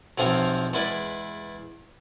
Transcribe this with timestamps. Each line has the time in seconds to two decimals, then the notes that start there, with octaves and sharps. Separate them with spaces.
0.18 B1 E2 F3 C4 G#5 A#5
0.73 E2 G#3 E4 B4 D5